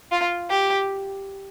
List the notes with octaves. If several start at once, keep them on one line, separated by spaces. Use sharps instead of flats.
F4
G4